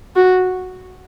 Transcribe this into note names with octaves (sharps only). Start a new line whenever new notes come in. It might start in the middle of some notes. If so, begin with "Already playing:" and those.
F#4